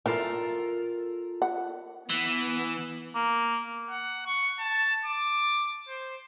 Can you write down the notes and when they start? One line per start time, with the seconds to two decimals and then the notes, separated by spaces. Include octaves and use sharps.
0.06 E3 F4 A4 A#4
1.42 F#5
2.10 E3 B3
3.15 A#3
3.90 F#5
4.26 C#6
4.59 A5
5.05 D6
5.88 C5